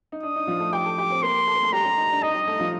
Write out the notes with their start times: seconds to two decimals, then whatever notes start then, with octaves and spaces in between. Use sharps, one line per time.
0.12 D#4
0.23 D4 D#6
0.36 D#4
0.47 F3 F4
0.60 A3 A4
0.72 G4 G5 D6
0.85 A4 A5
0.98 G4 G5
1.10 C4 C5
1.23 A#3 A#4 C6
1.48 A4
1.55 A#4
1.63 A3 A4
1.72 G3 G4 A#5
1.85 G3 G4
1.97 D#4
2.11 D4
2.22 D#4 D#5
2.35 G3 G4
2.48 A3 A4
2.60 F3 F4